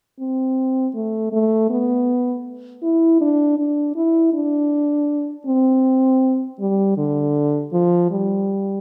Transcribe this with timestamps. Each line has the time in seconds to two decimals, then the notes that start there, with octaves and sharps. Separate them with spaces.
0.20 C4
0.94 A3
1.33 A3
1.70 B3
2.83 E4
3.21 D4
3.58 D4
3.96 E4
4.33 D4
5.47 C4
6.60 G3
6.98 D3
7.73 F3
8.11 G3